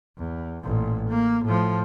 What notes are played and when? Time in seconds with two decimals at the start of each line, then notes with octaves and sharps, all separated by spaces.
0.18 E2
0.64 A1 A#2
1.09 A#3
1.45 A2 F3